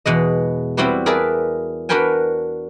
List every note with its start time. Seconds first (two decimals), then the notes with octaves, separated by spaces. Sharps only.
0.06 E2 B2 G#3 D#5
0.77 G3 C4 E4 F#4 G4 B4
1.06 G#4 A#4 B4 D5 E5 A5
1.89 D4 F#4 A#4 B4 G5 G#5